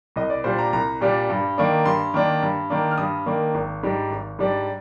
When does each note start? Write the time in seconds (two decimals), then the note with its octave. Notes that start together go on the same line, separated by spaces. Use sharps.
0.16 C2 D#5
0.30 D5
0.44 A#2 G3 D4 C5
0.58 A#5
0.73 C2 A#5
1.01 A#2 G3 D4
1.30 G2
1.58 D#3 A#3 D4
1.85 G2 C6
2.14 D#3 A#3 D4
2.42 G2
2.70 D#3 A#3 D4
2.91 F6
2.98 G2 D#6
3.26 D#3 A#3 D4
3.54 G#1
3.83 G#2 G3 D4
4.11 G#1
4.39 G#2 G3 D4